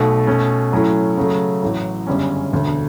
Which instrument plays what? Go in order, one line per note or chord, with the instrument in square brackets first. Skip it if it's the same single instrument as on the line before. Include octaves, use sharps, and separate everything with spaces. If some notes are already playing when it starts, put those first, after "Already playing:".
Already playing: [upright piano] B1 B2 A3
B2 A3 C#4
A2 F#3 A3 C#4 E4
C#3 F#3 A3
A1 A2 F#3
G1 F#2 C#3 G3 C#4
E1 D2 D3